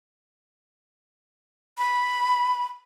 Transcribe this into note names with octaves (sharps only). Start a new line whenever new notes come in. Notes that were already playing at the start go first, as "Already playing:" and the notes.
B5